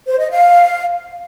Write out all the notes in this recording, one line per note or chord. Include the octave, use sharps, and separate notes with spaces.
C5
D#5
F5